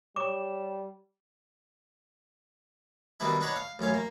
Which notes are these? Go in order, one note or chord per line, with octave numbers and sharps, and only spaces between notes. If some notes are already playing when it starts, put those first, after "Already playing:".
G3 C#5 D6 E7
B2 D#3 G3 B3 D4 E4
D4 D#4 B4 C#5 F#5
F5
A1 F#2 C#4 F5
A#3